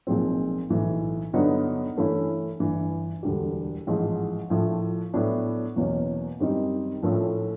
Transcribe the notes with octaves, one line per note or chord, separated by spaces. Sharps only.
B1 A#2 F3 G#3 C4
B1 A2 E3
G2 D3 F#3 B3 D#4
G2 E3 A3 C#4 E4
G1 G2 E3
E1 D2 D3 G3
A1 G#2 F3 G#3
A#1 A2 F3
A2 F#3 B3 D4
E2 B2 F#3 A#3 C#4
F#2 D#3 G3 C4 D#4
A#1 A2 F3 A3 C#4